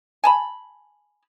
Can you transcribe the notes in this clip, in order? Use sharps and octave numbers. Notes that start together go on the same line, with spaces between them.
G#5 A5 B5